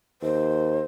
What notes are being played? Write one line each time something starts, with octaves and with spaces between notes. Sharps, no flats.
D#2 C5